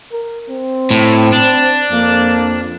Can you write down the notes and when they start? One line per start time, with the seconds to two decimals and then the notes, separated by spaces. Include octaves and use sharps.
0.12 A#4
0.49 C4
0.91 A2
1.33 D4
1.91 F2 A#3